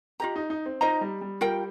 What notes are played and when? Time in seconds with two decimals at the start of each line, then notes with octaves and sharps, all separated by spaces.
0.20 F4 G4 D#5 A#5
0.36 D#4
0.50 D#4
0.66 C4
0.81 D#4 F4 C5 D#5 A#5
1.01 G3
1.21 G3
1.41 G3 F4 A#4 G5